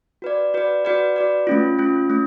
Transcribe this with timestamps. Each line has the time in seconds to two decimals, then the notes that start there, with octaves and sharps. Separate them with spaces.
0.22 F#4 B4 D5
0.54 F#4 B4 D5
0.85 F#4 B4 D5
1.16 F#4 B4 D5
1.47 A3 C#4 F4
1.78 A3 C#4 F4
2.10 A3 C#4